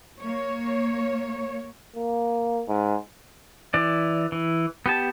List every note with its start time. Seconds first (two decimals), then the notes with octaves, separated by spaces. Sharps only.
0.20 A#3 C#5
1.96 A#3
2.68 G#2
3.74 E3 D5
4.32 E3
4.86 B3 G4 A5